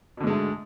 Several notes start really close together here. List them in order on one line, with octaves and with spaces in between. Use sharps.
B2 D3 G#2 G#3 A3